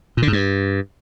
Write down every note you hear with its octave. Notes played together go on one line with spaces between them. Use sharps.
A#2
D3
G#2
G2